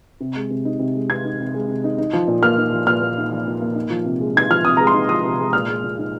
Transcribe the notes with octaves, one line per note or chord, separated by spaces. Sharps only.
C3
G#3
C3
D#4
C3
G#3
C3 G#6
D#4
C3
G#3
C3
D#4
D#4
F3
A#2
A#3 F6
D#4
F3
A#2 F6
A#3
D#4
F3
A#2
A#3
D#4
F3
C3
G#3
D#4 G#6
F3 F6
C3 D#6
G#3 A#5
C6
D#4
F3 D#6
C3
G#3
A#2 F6
G#3
A#2
D#4